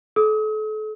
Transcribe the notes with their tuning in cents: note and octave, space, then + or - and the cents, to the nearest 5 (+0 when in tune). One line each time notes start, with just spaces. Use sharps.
A4 -35 D#6 +40